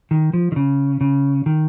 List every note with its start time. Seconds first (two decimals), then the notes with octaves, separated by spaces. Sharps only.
0.11 D#3
0.33 F3
0.52 D#3
0.56 C#3
1.01 C#3
1.46 D#3